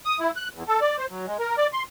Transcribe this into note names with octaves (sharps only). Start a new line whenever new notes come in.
D#6
E4
F#6
E2
A4
D5
C5
F#3
G#3
A#4
D5
C6